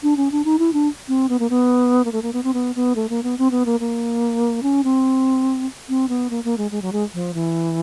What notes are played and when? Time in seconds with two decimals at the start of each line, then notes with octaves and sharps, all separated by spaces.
0.03 D4
0.17 C#4
0.32 D4
0.45 D#4
0.59 E4
0.73 D4
1.08 C4
1.29 B3
1.39 A#3
1.50 B3
2.05 A#3
2.12 A3
2.22 A#3
2.33 B3
2.44 C4
2.54 B3
2.76 B3
2.96 A3
3.09 A#3
3.23 B3
3.38 C4
3.51 B3
3.66 A#3
3.80 A#3
4.63 C#4
4.84 C4
5.89 C4
6.09 B3
6.30 A#3
6.44 A#3
6.58 G#3
6.71 G#3
6.82 F#3
6.93 G#3
7.14 F3
7.34 E3